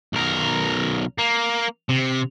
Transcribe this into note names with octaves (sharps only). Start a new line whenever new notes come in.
B1 A#4
A#3
C3